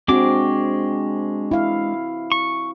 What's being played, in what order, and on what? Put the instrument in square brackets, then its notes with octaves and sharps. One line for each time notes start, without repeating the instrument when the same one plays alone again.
[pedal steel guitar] G#3 D4 D6 [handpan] C4 F#4
[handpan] E4 F5
[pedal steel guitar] C#6